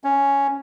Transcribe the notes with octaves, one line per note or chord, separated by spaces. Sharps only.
C#4